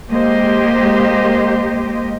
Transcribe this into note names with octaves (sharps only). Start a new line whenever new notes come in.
G#3 A#3 G4 C5 D#5